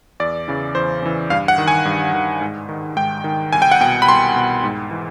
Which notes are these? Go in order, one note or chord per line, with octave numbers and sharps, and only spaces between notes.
E2 D5
C#3 E3
E2 C5
C#3 E3
G2 F5
F#5
D#3
G#5
G2
D#3
G#2
D#3
G#2 G5
D#3
C2 G#5
G5
F#5
B2 G5
B5
C2 C6
B2
G#2
E3